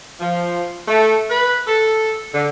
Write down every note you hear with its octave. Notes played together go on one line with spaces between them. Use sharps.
F3
A3
B4
A4
D3